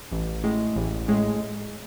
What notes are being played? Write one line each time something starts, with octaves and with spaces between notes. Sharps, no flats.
A1
A2 G#3
A1
A2 G#3